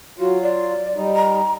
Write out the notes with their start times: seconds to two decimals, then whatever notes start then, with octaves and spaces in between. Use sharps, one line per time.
0.19 F#3 F4 F#4
0.43 D5
0.95 G3 D#4
1.16 A#5